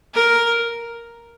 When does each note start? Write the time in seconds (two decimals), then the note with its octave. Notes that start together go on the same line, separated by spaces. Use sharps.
0.14 A#4